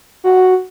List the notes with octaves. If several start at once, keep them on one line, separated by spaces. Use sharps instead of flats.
F#4